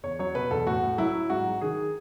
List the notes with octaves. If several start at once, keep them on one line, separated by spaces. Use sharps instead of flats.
E2 C#5
F#3 C#5
B2 B4
E2 A4
A2 F#4
A2
F#3 E4
F#3
G#2 F#4
F#3
D#3 G#4